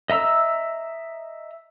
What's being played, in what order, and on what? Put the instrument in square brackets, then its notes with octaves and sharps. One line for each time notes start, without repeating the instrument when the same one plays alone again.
[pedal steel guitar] D#5 E5 A#5 E6